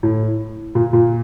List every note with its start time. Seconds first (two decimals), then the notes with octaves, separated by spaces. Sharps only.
0.03 A2
0.75 A#2
0.93 A#2